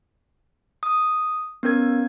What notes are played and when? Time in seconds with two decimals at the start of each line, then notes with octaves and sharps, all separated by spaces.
0.83 D#6
1.63 B3 C#4 A#4 G#6